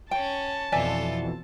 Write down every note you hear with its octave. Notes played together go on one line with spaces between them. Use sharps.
C#4 C#5 G5 A5
F2 B2 E3 F4 A4 D5 E5 G#5